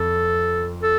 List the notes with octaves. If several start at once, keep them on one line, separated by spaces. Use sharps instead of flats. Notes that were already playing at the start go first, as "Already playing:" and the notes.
Already playing: F2 A4
A4